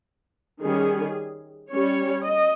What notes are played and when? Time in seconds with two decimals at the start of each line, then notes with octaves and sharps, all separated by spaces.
0.61 D#3 G3 C#4 G#4
1.70 G3 C#4 C#5
2.25 D#5